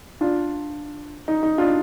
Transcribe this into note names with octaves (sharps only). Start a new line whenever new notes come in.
D4 F4
D#4
D#4
D4 F4